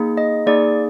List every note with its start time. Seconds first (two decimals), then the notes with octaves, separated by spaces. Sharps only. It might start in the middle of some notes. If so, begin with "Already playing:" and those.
Already playing: A#3 D#4 G#4
0.17 D#5
0.47 A#3 D#4 G#4 D5